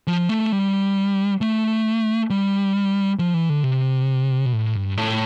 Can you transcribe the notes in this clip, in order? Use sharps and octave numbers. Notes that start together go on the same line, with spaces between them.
F3
A3
G3
A3
G3
F3
E3
D3
C3
B2
A2
G2
A2